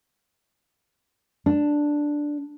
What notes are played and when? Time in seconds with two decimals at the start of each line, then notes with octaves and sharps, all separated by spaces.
1.46 D4